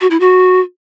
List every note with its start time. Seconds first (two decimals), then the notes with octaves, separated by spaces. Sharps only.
0.01 F#4
0.10 E4
0.20 F#4